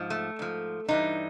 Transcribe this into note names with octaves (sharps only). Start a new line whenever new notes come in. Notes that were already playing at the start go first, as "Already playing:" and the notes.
Already playing: G#2 F3
A3
G#2 F3
G2 E3 G3 D#4